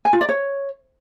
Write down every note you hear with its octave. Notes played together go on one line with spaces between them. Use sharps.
G#5
F4
D5
C#5